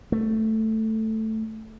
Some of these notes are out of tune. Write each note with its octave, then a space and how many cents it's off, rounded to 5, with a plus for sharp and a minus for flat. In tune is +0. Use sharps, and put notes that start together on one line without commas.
A3 +5